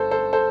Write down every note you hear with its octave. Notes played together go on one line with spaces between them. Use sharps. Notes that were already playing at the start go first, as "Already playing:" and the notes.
Already playing: G1 A4 C5
A4 C5
A4 C5